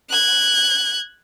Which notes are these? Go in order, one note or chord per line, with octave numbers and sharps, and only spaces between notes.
F#6 G#6